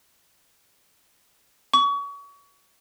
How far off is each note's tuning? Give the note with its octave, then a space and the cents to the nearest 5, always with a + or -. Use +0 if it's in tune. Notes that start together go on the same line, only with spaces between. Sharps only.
C#6 +30